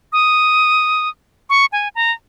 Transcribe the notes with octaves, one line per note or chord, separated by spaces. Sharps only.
D#6
C#6
G#5
A#5